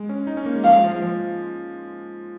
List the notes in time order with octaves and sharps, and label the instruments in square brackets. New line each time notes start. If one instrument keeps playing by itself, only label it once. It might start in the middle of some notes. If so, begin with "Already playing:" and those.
Already playing: [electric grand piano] G#3
C#4
D#4
C#4
A#3
G#3
[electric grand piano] F3 [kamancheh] F5
[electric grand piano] G#3
F3
G#3
F3